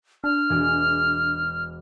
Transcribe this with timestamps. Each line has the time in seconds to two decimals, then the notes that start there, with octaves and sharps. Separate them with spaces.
0.24 D4 F6
0.49 E1 G#4 D6